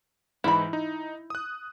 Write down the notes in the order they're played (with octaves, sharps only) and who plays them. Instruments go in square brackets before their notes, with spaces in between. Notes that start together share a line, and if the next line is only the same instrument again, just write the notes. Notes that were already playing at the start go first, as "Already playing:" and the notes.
[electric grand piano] G#2 E3 D#4 [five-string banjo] E4 B5
[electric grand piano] D#4
D#6 F#6